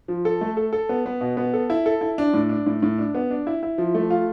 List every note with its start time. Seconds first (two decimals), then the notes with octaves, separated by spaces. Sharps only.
0.08 F3
0.25 A4
0.41 A3
0.57 A4
0.73 A4
0.89 B3
1.06 B3
1.21 B2
1.37 B3
1.54 A4
1.70 E4
1.86 A4
2.01 E4
2.18 D4
2.33 A2
2.49 D4
2.66 A2
2.82 A2
2.98 D4
3.15 B3
3.30 D4
3.47 E4
3.63 E4
3.78 F3
3.94 A3
4.10 F4